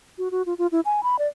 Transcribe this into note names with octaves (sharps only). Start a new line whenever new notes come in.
F#4
F#4
F4
F4
E4
G#5
B5
D5